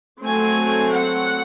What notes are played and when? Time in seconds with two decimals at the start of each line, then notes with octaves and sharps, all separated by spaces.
0.23 F#3 A3 C4 G#5
0.91 F#5